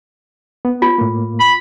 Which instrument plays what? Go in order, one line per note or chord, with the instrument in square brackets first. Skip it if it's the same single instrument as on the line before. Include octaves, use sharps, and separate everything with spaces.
[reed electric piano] B3
[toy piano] F4
[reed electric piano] A2 A#3
[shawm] B5